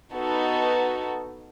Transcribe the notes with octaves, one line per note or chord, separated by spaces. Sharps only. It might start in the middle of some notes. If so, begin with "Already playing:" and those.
B3 D#4 F#4 A4